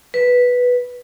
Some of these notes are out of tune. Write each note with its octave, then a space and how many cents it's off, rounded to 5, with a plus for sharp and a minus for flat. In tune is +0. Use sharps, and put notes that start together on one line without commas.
B4 -5